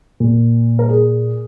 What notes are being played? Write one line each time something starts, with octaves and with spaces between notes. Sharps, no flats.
A#2
A#4
G#4